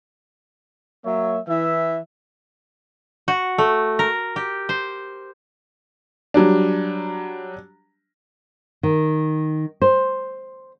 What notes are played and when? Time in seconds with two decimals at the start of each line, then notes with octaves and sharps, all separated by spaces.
1.06 F#3 A#3 C#5 E5
1.48 E3 E5
3.28 F#4
3.58 A3
3.99 A#4
4.36 G4
4.69 C5
6.34 F#3 G3 D4
8.83 D#3
9.82 C5